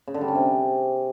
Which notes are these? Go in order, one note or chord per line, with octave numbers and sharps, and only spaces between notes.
C#3
D3
G3
C#4
C3